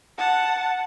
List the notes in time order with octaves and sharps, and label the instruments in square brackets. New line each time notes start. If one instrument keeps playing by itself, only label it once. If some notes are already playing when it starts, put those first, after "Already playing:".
[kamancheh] F#5 A5